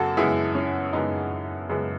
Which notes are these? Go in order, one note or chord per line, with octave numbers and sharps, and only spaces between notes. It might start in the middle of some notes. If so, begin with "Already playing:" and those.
Already playing: F#2 C#3 B3 F#4 A4
F#2 C#3 G#3 B3 E4 G#4
C#4
F#2 C#3 G#3 B3 D#4
F#2 C#3 G#3 B3